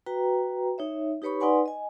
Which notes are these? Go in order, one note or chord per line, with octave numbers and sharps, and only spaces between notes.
F#4 B4 G5 A#5
D#4 C#5 E5
D#4 G4 B4 C#5 B5 C#6
D#4 B4 D5 F#5 G#5 C6
D#5 G#5